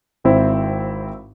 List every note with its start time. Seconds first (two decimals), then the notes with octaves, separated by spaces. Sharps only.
0.24 G#1 C4 E4 C5